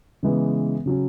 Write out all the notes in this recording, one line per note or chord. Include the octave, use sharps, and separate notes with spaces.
C#3 E3 G#3 B3
C#3 F#3 C#4